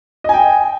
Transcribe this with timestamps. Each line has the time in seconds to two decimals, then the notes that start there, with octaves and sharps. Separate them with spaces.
0.24 D#5
0.29 G#5
0.34 G5